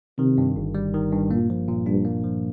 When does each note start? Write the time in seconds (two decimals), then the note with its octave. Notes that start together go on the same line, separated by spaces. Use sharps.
0.19 C3 D#3
0.38 G2
0.56 G1
0.75 G3
0.94 D#3
1.12 G2
1.30 A#2 A#3
1.50 F3
1.68 A#2
1.87 G2 D4
2.05 A#3
2.24 F3